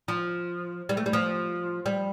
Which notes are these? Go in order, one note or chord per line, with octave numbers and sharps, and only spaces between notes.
F3
G3
A3
G3
F3
G3